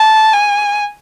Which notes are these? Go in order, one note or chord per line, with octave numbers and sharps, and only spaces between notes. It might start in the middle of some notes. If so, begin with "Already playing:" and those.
Already playing: A5
G#5